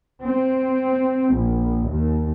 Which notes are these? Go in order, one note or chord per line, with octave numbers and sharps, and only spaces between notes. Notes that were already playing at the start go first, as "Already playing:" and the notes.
C4
A#1
D#2